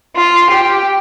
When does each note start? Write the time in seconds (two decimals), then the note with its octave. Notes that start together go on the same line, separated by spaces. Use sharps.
0.15 F4
0.49 G4